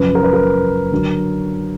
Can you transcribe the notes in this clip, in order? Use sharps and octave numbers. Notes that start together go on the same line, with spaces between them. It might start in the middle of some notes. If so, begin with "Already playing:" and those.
Already playing: F#2 C#3 F3 B4
A#4
B4
A#4
D3 F#3